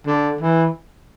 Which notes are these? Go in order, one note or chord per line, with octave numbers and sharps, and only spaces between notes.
D3
E3